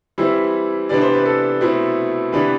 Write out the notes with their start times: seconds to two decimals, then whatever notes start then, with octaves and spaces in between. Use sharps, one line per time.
0.18 E3 G3 C4 E4 E5
0.89 C3 E3 B3 D4 D5
1.01 C5
1.14 B4
1.26 A4
1.61 B2 A3 C4 E4
2.32 C3 E3 B3 D4 B4